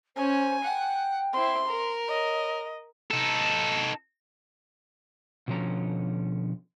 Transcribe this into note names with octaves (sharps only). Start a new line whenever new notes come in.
C#4 C5 G#5
F#5 G5
C4 E4 C6
A#4
C#5 D#5
D#4 A4
B2 D3 F3 C#4 A#5